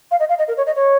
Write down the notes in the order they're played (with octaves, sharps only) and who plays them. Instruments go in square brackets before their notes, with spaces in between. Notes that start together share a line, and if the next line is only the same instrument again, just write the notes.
[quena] F5
D#5
F5
D#5
A#4
C#5
D#5
C#5